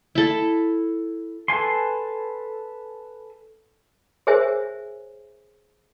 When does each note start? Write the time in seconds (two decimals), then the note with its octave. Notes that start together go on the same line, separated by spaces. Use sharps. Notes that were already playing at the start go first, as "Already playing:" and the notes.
0.15 E4 A4
1.48 A4 B4 G#5 C6
4.27 G#4 A#4 C5 C#5 E5 G#5